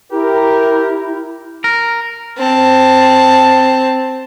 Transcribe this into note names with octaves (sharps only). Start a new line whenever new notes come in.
E4 G4 A#4
A#4
C4 A5